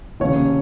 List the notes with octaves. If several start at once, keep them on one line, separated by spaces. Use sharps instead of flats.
F1 D#2 C#3 C#5